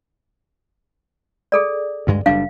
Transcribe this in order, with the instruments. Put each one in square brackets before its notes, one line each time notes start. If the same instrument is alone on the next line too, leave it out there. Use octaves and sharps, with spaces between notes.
[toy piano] G#4 A4 D5
[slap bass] D2 G2 G#3
[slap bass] F#1 G3 D4 [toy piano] F5